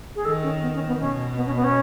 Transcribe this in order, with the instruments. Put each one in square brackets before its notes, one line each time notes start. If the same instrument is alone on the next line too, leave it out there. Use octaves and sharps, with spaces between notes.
[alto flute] G#4
[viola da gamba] D#3 [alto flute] A4
[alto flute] C#4
B3
C#4
B3
[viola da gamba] B2 [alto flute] C#4
[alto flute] B3
C#4
B3
C#4